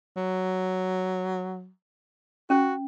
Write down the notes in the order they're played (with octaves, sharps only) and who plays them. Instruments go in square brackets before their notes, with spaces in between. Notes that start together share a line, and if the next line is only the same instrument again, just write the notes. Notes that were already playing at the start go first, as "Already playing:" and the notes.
[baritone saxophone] F#3
[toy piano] C#4 [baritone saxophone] F#4